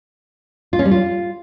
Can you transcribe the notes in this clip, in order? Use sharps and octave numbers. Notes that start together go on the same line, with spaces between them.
F4
C#4
G3
F4